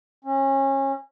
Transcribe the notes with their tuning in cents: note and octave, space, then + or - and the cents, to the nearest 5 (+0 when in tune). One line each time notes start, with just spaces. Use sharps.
C#4 -30